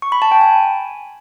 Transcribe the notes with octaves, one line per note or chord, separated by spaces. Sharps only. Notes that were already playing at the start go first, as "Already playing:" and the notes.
C#6
B5
A5
G5
G#5